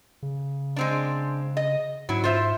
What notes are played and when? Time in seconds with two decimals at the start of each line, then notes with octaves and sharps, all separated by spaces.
0.22 C#3
0.76 G#3 C4 D4
1.57 D#5
2.09 G#2 F#3 E4
2.24 F4 C5 E5